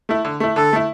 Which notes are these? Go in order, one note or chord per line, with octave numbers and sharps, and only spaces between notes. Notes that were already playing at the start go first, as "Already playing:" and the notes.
A3 E4
D3
A3 E4
D3 A4
A3 E4